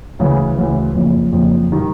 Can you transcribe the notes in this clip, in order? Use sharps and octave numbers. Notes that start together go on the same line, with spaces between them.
D2 C#3 E3
D2 C#3 E3
F#1 F2 C#3
F#1 F2 C#3
D#3 G3